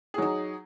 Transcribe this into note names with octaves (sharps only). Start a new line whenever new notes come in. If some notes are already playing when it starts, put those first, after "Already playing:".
F#3 D#4 G#4